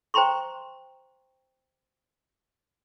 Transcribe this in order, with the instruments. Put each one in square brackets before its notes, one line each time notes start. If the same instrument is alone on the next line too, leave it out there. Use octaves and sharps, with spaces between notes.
[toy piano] C5 G5 A#5 C6 C#6